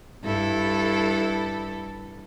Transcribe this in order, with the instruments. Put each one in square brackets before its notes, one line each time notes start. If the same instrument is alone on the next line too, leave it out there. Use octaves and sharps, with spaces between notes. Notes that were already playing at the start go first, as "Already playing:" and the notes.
[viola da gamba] G2 E4 A4